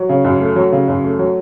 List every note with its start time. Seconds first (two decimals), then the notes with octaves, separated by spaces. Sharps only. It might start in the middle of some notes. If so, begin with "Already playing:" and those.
Already playing: F#3
0.09 C#3
0.25 F#2
0.41 A3
0.56 F#3
0.72 C#3
0.88 F#2
1.04 A3
1.19 F#3